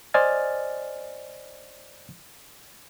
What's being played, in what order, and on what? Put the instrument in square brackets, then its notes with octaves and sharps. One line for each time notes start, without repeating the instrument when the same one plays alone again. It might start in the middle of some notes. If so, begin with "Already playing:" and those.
[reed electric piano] C5 D5 D#5 G#5 F6 A6